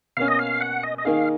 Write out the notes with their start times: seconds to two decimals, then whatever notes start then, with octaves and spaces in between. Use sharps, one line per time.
0.17 B2 A#3 C#4 F5
0.28 D#5
0.39 F5
0.61 F#5
0.83 D#5
0.98 D#5
1.05 D#3 A#3 D#4 G#4 F5